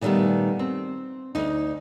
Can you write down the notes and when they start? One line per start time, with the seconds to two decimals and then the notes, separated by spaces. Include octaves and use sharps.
0.01 A#2 D#3 F#3 G3 A3 B3
0.59 C4
1.35 D2 D#4